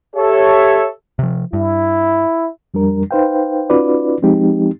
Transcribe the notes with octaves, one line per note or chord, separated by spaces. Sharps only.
G4 A4 C#5 E5
C3 F3
G2 E4
F2 G3 D4 A#4
D#4 B4 C5 F5 G5
C#4 D#4 F4 F#4 B4 D5
F3 G#3 C4 D#4 G4